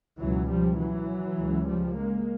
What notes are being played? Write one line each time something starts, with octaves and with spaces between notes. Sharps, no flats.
C#2 B2 E3 F#3
F3 G3
E3 F#3
C#2 C#3
F3 G3
G#3 A#3